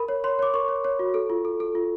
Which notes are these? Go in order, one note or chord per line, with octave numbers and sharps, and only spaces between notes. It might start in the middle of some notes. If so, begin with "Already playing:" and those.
Already playing: A#4 B5
C#5
C#5 C6
C#5 D6
A#4 C#6
C#5
C#5
F#4
A4
F4
A4
A4
F4